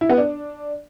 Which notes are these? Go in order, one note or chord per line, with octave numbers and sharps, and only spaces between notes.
E4
B3
D4